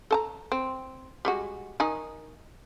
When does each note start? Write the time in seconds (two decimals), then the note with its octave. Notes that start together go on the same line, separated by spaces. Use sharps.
0.11 A4 A5 A#5
0.52 C4
1.25 G3 G#3 F#4
1.80 D#3 D#4 G#5